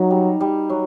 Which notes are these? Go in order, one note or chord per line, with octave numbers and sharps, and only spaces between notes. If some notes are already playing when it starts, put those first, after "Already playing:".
Already playing: F#3 D#4
G3
G3
F#3